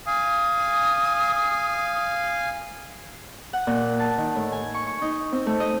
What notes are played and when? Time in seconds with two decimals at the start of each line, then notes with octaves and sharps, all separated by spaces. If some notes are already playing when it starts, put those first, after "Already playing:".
0.07 F5 G#5 D#6
3.53 F#5
3.67 A#2
3.99 A5
4.18 D#3
4.36 A2
4.52 G#5
4.74 C#6
4.87 C#6
5.02 D#4
5.32 C4
5.46 A3
5.60 D#5